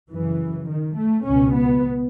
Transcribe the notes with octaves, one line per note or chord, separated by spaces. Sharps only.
F#2 C#3 E3
D#3
A3
C#2 B2 C#4
B3